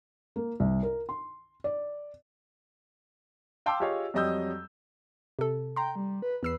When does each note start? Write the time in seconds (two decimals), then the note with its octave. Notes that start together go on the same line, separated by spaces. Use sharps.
0.36 A#3
0.60 C2
0.83 A#4
1.09 C6
1.64 D5
3.66 F5 G5 A5 C6 D6 E6
3.80 F4 G4 G#4 C#5 D#5 F5
4.14 F2 F#3 G3 D#5 E6 G6
5.39 C3 A4
5.76 G5 A#5 C6
5.96 G3
6.22 B4
6.43 E2 B4 E6 C7